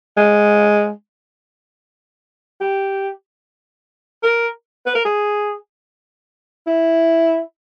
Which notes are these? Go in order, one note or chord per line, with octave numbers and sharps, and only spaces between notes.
G#3
G4
A#4
B4
A#4
G#4
E4